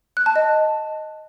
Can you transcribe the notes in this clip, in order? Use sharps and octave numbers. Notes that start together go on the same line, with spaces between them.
F#6
A5
D#5